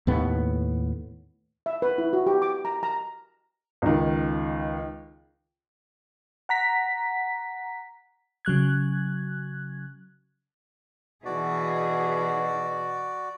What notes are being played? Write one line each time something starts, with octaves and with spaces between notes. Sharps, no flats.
D#2 A2 B3
E5
B4
E4
F#4
G4
D6
A#5
A#5
C#2 D#3
F#5 A#5 B6
C#3 F#3 F#6 G#6
B2 E3 F#4 G#4 D5